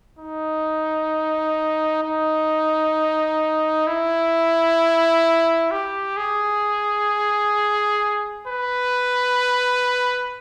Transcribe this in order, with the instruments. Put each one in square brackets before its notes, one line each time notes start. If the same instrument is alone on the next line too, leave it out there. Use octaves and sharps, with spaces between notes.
[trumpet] D#4
D#4
E4
G4
G#4
B4